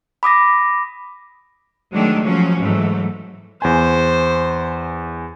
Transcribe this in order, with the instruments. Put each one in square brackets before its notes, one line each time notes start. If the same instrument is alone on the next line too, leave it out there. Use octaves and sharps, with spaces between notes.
[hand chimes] B5 D6 D#6 A#6
[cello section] D#3 F#3 G#3 A3 D4
F3 F#3 C#4
G#2 E3 F#3 A3
[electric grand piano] E2 G#5 [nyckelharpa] C5